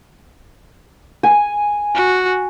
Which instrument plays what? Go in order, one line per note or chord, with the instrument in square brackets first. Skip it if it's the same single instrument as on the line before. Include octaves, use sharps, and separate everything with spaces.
[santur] G#5
[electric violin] F#4